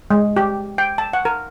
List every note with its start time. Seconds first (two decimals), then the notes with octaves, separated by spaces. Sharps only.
0.10 G#3
0.37 G4
0.78 G5
0.98 A5
1.13 F#5
1.25 A#4